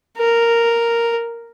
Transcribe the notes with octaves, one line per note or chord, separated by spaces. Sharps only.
A#4